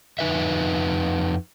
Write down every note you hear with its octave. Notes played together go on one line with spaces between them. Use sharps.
F2 D#4 B4 E5